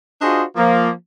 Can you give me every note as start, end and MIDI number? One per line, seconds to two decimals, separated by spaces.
0.21 0.42 62
0.21 0.42 65
0.21 0.42 66
0.21 0.42 68
0.21 0.42 72
0.21 0.42 75
0.56 0.89 53
0.56 0.89 58